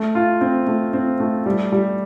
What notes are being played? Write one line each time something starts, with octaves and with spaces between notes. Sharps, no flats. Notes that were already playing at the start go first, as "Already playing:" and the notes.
Already playing: A3
F4
C4
A3
C4
A3
G3
G3